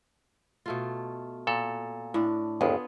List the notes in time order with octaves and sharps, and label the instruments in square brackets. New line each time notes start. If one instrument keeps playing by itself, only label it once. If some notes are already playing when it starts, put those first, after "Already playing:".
[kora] B2 A3 F4
[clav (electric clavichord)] A#2 A4
[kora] A2 D4
[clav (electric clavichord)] G1 D#2 [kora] B3 F4 G#4